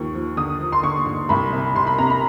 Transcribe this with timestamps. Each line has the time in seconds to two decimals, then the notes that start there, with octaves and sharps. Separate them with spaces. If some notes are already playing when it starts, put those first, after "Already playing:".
Already playing: D#2 F3 C#6
0.14 F3
0.37 D3 D#6
0.60 F3
0.72 C6
0.83 D3 C#6
1.06 D3
1.29 C2 B5
1.53 C3
1.76 C3 C6
1.87 B5
1.98 C3 A#5
2.10 B5